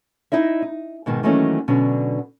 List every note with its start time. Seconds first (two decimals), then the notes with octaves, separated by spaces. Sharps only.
0.32 D#4 E4 D#5 E5
0.62 D#4
1.06 G#2 B2 D#3
1.23 D#3 E3 F#3 A3 A#3 C#4
1.68 B2 D3 F#3 C#4 D4